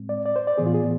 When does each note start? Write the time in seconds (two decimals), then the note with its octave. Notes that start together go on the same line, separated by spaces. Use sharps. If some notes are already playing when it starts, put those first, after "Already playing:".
Already playing: A2 G#3 C4
0.09 D5
0.25 D5
0.36 C5
0.47 D5
0.58 A2 E3 B3 G#4
0.66 F4
0.74 G#4